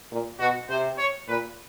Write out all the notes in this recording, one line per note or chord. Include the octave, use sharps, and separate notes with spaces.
A#2
B2 F#4
C3 C5
C#5
A#2 B4